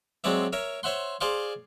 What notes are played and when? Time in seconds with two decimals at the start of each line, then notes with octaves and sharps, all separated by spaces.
0.24 F#3 G#3 C4 C#5 D5 E5
0.53 A#4 C#5 E5
0.83 C5 C#5 E5 F#5 C6
1.21 G#4 C5 D5 F5 C6 C#6